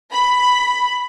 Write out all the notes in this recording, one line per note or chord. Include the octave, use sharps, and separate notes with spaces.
B5